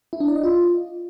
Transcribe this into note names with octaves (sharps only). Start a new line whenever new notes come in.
E4
D4
D5
D#5
F4